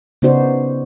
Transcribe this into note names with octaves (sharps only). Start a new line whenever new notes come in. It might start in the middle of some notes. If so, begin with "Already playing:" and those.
C#3 B3 D#4 F#4 C5 D5